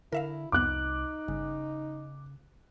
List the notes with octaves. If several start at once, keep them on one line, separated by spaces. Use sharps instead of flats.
D3 E4 A#4 E5 F5
C2 F2 B3 D#4 D6 F#6
G1 C#3